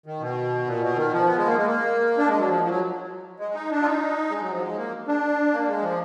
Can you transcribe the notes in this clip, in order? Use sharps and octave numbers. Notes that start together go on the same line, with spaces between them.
D#3
B2
A#2
B2
D#3
F3
B3
G#3
A#3
G#3
A#3
D4
G#3
F#3
F3
F3
F#3
G#3
D#4
D4
F4
D#4
G#3
F#3
F3
F#3
G#3
A#3
D4
A#3
G#3
F3